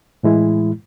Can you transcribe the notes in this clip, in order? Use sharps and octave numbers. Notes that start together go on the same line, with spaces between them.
A2 E3 G#3 E4